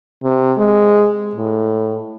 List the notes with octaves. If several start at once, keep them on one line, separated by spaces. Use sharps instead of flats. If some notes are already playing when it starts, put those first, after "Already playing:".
C3
G#3
A2